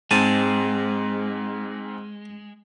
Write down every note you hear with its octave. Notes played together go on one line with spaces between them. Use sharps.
G#2 G#3 C4 G#5 A5